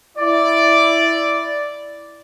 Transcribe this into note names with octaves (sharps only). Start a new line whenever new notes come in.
E4 D5